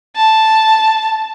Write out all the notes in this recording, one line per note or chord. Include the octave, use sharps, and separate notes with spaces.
A5